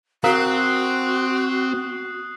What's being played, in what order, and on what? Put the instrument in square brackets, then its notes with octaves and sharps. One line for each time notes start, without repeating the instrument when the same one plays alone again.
[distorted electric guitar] C4 [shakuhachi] F#4 [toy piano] A#4 F5 A#5 [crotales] D#6 F#6 C7